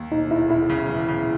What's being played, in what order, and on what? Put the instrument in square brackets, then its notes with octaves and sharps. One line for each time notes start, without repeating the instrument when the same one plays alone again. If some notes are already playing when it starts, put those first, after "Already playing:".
Already playing: [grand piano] D#2
[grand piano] E1 [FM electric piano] D#4
[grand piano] E1 [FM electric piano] E4
[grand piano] E1 [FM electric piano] E4
[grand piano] C#3
E3
C#3